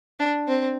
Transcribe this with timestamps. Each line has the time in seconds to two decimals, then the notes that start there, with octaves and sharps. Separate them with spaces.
0.19 D4
0.47 C4